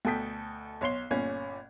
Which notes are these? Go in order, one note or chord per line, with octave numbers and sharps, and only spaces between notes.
D2 B2 A4 G5 D#6 B6
B1 C#5 C6 C7 G7
G1 A#2 C#4 G#6